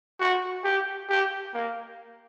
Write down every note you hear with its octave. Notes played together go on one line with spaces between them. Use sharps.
F#4
G4
G4
A#3